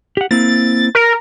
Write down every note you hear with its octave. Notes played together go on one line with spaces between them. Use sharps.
G4 F#5
A#3 C4 E4 A6
A#4